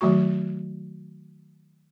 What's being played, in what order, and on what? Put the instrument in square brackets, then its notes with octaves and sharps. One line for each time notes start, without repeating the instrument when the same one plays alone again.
[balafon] D#3 F#3 A3 F#4 C#6